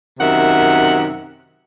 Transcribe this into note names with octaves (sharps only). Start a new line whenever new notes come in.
F#2 C3 D#3 E5 F#5